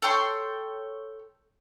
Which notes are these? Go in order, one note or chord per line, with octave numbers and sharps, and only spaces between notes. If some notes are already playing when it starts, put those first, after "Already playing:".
A4 C#5 G5 C6